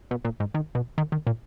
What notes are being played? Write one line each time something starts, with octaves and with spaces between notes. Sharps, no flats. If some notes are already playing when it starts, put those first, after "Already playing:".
B2
A#2
G#2
D#3
B2
D#3
D#3
A#2